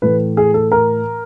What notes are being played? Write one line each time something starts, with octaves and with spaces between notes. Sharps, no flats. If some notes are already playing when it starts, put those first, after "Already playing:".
A2 E3 A3 B4
G#4
A4
A#4